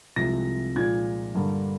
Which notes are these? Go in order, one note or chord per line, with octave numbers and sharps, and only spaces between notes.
C2 C3 F3 G#3 A#6
A#2 F3 G#3 G#6
G2 D3 G3 A#3